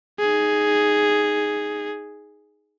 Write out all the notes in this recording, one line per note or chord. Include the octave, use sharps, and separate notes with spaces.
D#4 G#4